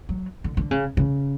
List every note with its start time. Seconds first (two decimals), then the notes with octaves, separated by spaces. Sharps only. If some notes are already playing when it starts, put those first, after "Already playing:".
0.09 F#3
0.44 D3
0.57 D3
0.71 C#3
0.97 C#3